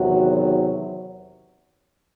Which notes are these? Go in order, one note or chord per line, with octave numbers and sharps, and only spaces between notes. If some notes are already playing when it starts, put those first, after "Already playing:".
Already playing: E2 C3 D#3 F#3 F#4